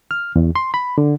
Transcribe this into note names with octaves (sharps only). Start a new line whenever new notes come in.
F6
E2
C6
B5
D3